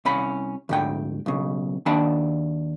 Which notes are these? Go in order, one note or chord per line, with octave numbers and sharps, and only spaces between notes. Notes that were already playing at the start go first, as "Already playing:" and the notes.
C2 C#4 B5
D2 G#2 G5
B1 C#3
D#2 D4 G5 A5 B5